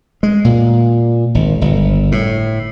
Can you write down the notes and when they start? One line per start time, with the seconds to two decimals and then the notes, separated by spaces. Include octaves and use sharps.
0.23 G#3
0.45 A#2
1.35 G#1
1.61 G1
2.12 A2